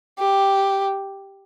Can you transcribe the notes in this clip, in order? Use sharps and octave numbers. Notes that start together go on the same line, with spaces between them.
G4